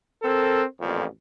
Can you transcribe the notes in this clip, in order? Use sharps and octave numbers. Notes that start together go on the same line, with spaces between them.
C4 A4 A#4
A1 F2 A#2